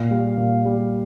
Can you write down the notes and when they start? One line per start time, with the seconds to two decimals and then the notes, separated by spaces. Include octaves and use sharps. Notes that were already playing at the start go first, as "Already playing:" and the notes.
Already playing: A#2 F5
0.11 G3
0.37 A#2
0.65 G3